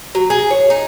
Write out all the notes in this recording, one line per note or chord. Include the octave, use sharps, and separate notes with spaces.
F#3
G#4
C#5
D#4